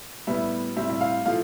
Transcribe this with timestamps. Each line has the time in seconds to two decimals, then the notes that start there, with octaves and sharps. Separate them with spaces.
0.27 A2 G3 B3 E5
0.76 A2 G3 C4 E5
0.90 E5
1.01 F5
1.25 A2 F3 A3 F5